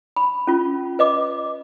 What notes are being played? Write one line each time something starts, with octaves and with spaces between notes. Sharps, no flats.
B5
C#4 F4
B4 D#5 D6